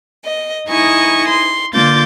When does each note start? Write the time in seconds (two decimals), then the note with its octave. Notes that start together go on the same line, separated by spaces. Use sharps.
0.25 D#5
0.69 D#4 E4 D#5 G#5 C#6
1.28 C6
1.74 D3 A#3 F4 D6 G6 A6